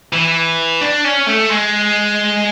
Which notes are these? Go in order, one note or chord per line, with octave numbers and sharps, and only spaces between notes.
E3
D4
C#4
A3
G#3